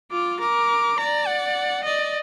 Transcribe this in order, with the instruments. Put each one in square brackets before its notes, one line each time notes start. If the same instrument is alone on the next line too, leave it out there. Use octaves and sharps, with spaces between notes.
[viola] F4 [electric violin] D6
[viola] A#4 [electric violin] D6
[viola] D5 [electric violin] A#5
[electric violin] F#5
[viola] D5 [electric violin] D#5